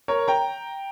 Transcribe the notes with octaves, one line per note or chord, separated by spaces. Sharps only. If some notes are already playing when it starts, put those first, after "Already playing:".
A#4 C#5
G5 A#5